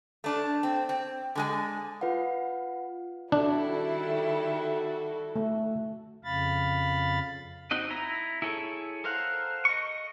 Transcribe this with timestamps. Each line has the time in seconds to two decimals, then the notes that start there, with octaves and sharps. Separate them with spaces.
0.24 A3 D4
0.63 C4
0.89 C4
1.35 D3 G#3 G#5
2.01 F4 B4 F5 F#5
3.32 D#3 G3 D4 E4 F#4 A4
5.36 A3
6.24 F2 C#3 F5 B5 A6
7.71 C4 D#4 F#4 D#5
7.90 E4 A#5
8.42 E4 G#4 A4 C#5
9.04 A4 A#4 C5 F5 F#5
9.65 D#5 C#6